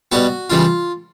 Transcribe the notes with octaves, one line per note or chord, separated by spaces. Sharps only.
B2 G3 B3 F#4
C#3 E3 G3 F4